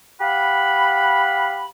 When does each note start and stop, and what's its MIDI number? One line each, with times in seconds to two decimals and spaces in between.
0.21 1.66 67
0.21 1.66 77
0.21 1.66 78
0.21 1.66 83